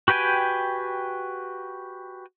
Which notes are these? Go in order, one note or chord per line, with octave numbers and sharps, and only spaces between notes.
F#4 G4 B4 G5 G#5